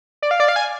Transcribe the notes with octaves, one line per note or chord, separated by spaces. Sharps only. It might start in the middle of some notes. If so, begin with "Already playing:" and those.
D5
F5
D5
F5
G#5